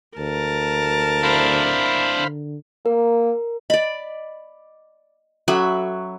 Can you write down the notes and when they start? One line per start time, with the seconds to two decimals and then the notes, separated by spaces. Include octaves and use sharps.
0.18 D2 A#4 A5
1.23 D4 E4 C5 F5 B5
2.18 D3
2.86 A#3 A#4
3.70 D5 D#5 B5
5.48 F#3 C#4 A4 E5 B5 D6